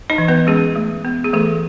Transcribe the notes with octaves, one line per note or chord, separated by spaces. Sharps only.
D#4 D#5
E3
B3 B4
G#3 C#4 G#4
A3
B3
G#4
E3 A3 A4